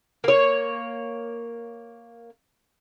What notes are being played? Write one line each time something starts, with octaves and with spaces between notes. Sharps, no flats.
A#3 C#5